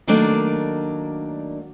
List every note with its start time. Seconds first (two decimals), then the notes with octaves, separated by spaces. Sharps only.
0.07 D#3 F#3 A3 A#3 D4 D5